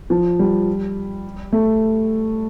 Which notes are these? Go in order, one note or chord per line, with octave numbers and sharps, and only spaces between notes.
F3
G3
A3